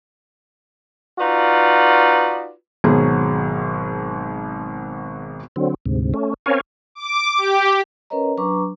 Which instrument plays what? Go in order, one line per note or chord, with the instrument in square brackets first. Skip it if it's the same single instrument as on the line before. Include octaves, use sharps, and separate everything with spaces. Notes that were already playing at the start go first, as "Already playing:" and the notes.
[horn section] D#4 F4 F#4 B4 D5
[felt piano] G#1 B2 F#3 G#4
[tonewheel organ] D3 F#3 C4
D2 G#2 C3
A3 C#4
C4 C#4 A#4 C#5 F5 G#5
[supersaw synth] D6
G4
[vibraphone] C#4 A#4 B4 C#5 D#5 A#5
F#3 D4 B4 A#5 C#6 D6